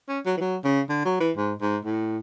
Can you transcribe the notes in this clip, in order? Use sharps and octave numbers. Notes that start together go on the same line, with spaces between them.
C#4
F#3
E3
F#3
C#3
D3
F#3
E3
G#2
G#2
A2